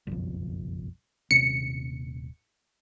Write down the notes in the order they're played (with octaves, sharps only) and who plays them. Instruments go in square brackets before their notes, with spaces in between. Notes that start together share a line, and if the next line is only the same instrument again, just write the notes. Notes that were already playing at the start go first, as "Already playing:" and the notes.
[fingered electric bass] F#1 B1 F2
[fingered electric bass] D#1 C3 C#4 [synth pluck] C#7